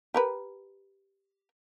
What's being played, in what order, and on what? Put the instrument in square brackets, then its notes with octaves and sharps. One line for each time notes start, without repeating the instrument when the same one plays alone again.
[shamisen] G4 A#4 B4